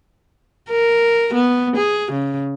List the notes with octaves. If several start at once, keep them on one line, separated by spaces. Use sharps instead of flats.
A#4
B3
G#4
C#3